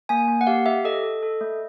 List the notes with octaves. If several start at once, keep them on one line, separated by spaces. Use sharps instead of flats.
A#3 G#5
A#3
F#5
G4 F5
G4 E5
A4 D#5
A4
A4
A3